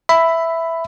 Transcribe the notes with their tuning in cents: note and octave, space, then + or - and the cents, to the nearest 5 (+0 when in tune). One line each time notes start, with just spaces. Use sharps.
E5 +0 B5 +10